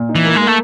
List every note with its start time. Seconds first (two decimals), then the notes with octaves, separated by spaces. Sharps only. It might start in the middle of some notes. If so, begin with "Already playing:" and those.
Already playing: A#2
0.09 D#4
0.15 E3
0.25 A#3
0.36 G#3
0.41 A#3
0.47 A3